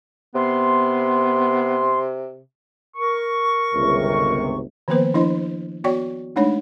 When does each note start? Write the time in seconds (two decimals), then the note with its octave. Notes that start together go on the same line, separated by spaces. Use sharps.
0.35 C3 B3 C6
2.96 A#4 C#6
3.74 G1 C#2 C3
4.88 D#3 F3 A#3 B3 B4 C5
5.14 F3 D4 E4 D#5 C6
5.84 B3 F#4 C#5 D5 G5 C#6
6.36 G#3 A3 D4 D#4 C#5 B5